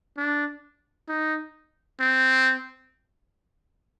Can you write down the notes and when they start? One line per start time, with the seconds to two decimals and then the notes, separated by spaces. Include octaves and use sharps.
0.17 D4
1.08 D#4
2.00 C4